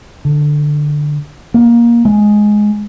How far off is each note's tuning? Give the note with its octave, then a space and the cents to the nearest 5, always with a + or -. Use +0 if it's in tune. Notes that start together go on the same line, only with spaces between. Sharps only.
D3 +10
A#3 +15
G#3 +5